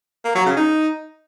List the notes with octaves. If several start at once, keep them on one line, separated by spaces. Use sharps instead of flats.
A#3
F#3
C#3
D#4